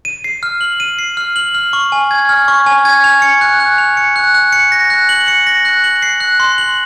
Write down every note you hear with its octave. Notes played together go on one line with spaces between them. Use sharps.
D#7
C7
F6
F#7
D#7
C7
F6
F#7
F6
C#6
G#5
G#6
F6
C#6
G#5
G#6
F7
C#7
F#6
F#6
F7
C#7
F#6
F#6
C#7
A#6
F#6
F#7
C#7
A#6
F#6
F#7
C7
F#6
C6
F#7